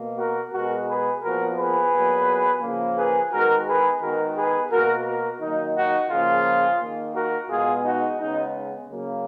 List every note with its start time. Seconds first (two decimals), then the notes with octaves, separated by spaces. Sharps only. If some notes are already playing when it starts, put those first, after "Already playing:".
Already playing: B2 A#3
0.18 F#4 A#4
0.53 B2 G#3 B3 F#4 A#4
0.88 G#4 B4
1.22 A#2 F3 B3 F#4 A#4
1.57 G#4 B4
1.92 A#2 F#3 B3
2.62 C#3 F3 A#3
2.96 G#4 B4
3.31 D#3 G#3 B3 F#4 A#4
3.66 G#4 B4
4.01 D#3 G#3 B3 F#4 A#4
4.36 G#4 B4
4.70 B2 A#3 F#4 A#4
5.06 F#4 A#4
5.40 D#3 F#3 A#3 D#4
5.75 D#4 F#4
6.10 C#3 F3 A#3 F4 G#4
6.80 D#3 A#3
7.15 F#4 A#4
7.49 B2 G#3 B3 F4 G#4
7.84 D#4 F#4
8.19 C#3 G#3 B3 D#4
8.89 C#3 F#3 A#3